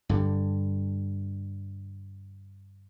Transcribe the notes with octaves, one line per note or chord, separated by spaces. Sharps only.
G2 D3 G3